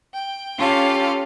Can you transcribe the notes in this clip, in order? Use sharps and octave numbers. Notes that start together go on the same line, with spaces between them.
G5
C#4 F4 G4 A4 F5